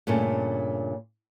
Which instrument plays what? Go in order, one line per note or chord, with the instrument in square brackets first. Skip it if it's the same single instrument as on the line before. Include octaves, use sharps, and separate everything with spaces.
[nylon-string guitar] G2 A#2 C#3 G3 A3 C#4